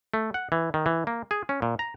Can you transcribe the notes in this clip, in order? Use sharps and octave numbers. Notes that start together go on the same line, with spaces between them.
A3
F#5
E3
D#3
E3
A#3
G#4
C#4
A#2
A#5